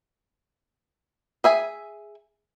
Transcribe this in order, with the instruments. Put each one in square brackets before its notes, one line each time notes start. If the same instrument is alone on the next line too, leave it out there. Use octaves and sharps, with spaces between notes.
[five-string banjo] G#4 E5 G#5